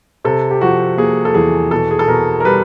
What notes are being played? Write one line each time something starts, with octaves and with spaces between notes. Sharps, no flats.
C3 A4
G4
F3 F#4
A#3 G#4
A4
E2 G#4
B2 A4
G#4
A4
B2 A#4
A#4
G3 B4